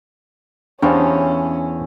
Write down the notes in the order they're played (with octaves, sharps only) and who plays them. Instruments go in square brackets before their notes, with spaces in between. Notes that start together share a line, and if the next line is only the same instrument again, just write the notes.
[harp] E2 [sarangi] C#4 [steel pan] D4 G4 F5 [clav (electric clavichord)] C5 C#5 G5